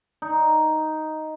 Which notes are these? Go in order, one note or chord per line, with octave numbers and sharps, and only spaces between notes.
D#4